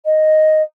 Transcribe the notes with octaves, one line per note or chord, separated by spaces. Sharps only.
D#5